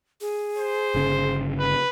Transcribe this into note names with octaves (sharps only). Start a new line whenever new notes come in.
G#4
C5
G1 C#3
B4